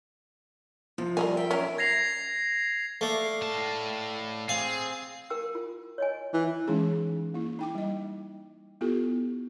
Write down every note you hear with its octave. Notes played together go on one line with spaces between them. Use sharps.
C3 F3
F#3 G3 A4 A#4 D#5 G#5
E5 G5
F#2 C#4 D#4 A#4
G#6 A#6 C7 F7
A3 D5 F5
A2 A5
C4 G#4 F5
A#4 G5 E6
F4
C#5 D#5 G#5
E3
E3 G#3 C#4 D#4 G#4
A#3 E4
D#4 G5 D6
G3 D#5
B3 E4 F4 G4 A4